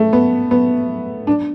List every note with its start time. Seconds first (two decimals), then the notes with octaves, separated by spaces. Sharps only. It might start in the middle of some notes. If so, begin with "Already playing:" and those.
Already playing: A3
0.13 B3
0.51 B3
1.27 D4